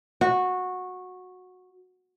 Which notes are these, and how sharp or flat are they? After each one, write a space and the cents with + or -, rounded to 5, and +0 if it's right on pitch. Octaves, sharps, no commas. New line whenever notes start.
F#4 -15